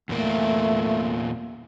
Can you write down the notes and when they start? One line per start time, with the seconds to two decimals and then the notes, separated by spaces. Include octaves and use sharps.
0.09 E2 A#2 A3 A#3